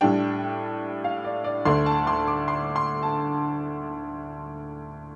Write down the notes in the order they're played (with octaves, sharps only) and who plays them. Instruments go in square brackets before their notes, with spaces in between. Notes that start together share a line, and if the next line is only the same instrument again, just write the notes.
[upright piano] A2 G3 D4 G5
F5
D5
D5
D2 D3 A3 D4 C6
A5
C6
D6
C6
C6
A5